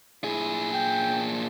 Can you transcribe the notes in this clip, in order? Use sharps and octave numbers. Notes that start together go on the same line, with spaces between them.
A#2 E4 G#4
G5